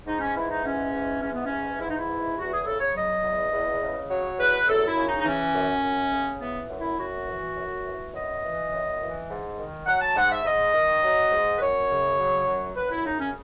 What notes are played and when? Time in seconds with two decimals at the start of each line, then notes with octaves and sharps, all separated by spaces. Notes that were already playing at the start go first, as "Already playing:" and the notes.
0.07 G#2 D#4
0.20 C#4
0.35 E3 E4
0.49 D#4
0.64 G#2 C#4
0.92 E3
1.21 G#2 C#4
1.33 B3
1.44 C#4
1.51 E3
1.79 G#2 E4
1.89 D#4
1.98 E4
2.09 E3
2.36 E2 F#4
2.52 G#4
2.65 C#3 A4
2.80 C#5
2.95 F#3 D#5
3.23 E2
3.52 E2
3.82 C#3
4.10 F#3 C#5
4.38 E2 B4
4.68 F#2 A4
4.87 E4
4.96 C#3
5.07 D#4
5.19 D#4
5.25 E3 C#4
5.54 F#2
5.83 F#2
6.13 C#3
6.41 E3 B3
6.69 F#2
6.80 E4
6.98 F#2 F#4
7.27 E3
7.57 F#2
7.86 E3
8.14 F#2 D#5
8.44 E3
8.72 F#2
9.01 E3
9.30 G#2
9.58 D#3
9.87 F#3 F#5
10.01 A5
10.16 G#2 F#5
10.31 E5
10.44 G#2 D#5
10.74 D#3
11.03 F#3
11.31 G#2
11.57 B4
11.61 F#2 C#5
11.90 C#3
12.19 F#3
12.47 F#2
12.76 F#2 B4
12.90 E4
13.04 C#3 D#4
13.19 C#4